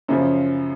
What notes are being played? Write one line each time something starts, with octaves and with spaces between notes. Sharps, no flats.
F#2 C#3 F3